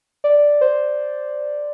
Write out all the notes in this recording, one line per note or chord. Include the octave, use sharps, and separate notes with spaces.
D5
C5